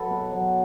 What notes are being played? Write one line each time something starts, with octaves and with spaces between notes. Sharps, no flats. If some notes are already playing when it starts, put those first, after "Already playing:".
Already playing: F#3 A4 B4
B2
F#3